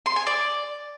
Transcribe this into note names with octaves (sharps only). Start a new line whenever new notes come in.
C6
G#5
D5